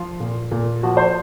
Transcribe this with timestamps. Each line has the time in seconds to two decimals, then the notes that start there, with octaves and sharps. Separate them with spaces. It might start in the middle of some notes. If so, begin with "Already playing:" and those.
Already playing: F3 F4
0.20 A#2
0.51 A#2
0.83 F3 F#4
0.97 C5